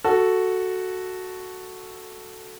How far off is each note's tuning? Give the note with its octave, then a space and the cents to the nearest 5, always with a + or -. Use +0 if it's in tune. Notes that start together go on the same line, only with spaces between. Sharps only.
F#4 +0 A4 +0